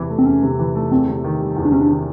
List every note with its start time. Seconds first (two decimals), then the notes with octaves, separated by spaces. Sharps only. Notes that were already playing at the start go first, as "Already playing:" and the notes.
Already playing: E2 C3 E3
0.10 A3
0.19 C4
0.26 E2 C#4
0.43 C3
0.59 E3
0.75 A3
0.91 E2 C4
1.08 C3
1.24 D#3
1.41 G3
1.56 E2
1.65 D4
1.72 C3 C#4
1.80 D4
1.89 D#3